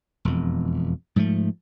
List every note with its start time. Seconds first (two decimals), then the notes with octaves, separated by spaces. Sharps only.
0.25 E1 F2
1.16 G#2 F3 G3 A3